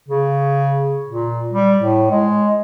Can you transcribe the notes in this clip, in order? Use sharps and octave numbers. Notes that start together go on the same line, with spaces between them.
C#3
A#2
G3
A2
G#3